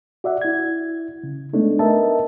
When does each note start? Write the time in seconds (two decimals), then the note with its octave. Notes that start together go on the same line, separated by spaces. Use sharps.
0.24 F#4 D5 E5 F#5
0.41 E4 G#6
1.23 C#3
1.53 G#3 A3 B3 D4 D#4
1.79 A#4 B4 D#5 E5 A5